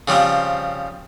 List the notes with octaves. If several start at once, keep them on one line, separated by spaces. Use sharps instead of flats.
C#3 F3 G3 C4